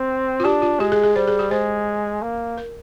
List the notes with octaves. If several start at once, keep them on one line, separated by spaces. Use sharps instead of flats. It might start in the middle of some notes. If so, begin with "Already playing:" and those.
Already playing: C4
F4
D4 G4
F4
G#3 G4
G#4
G#4
G3 C5
G#4
G4
G#3 C5
A#3
A#4